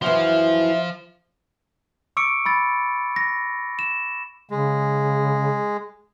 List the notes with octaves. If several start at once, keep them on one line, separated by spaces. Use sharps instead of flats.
F#2 E3 F3 E5
C#6 D6 E6 C#7 D7
B5 E6 A6
A#6
E7
C#3 G#3